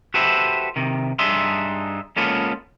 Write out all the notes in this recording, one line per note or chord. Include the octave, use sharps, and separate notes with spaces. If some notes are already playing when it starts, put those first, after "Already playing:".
F#4 G4 A4 B4 C5 E5
C3 D#3
G2 D4 D#4 G#4 E5 C6
G#3 A#3 B3 C#4 F4 A4